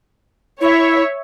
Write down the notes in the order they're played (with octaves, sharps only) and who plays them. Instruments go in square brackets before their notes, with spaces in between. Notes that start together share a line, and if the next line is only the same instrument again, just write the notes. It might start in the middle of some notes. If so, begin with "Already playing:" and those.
[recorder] E4 [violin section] C#5 E5